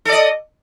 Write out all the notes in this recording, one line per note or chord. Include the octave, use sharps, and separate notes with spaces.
A4 D5 D#5